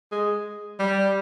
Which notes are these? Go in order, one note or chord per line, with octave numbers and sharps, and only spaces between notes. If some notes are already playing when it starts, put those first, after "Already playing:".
G#3
G3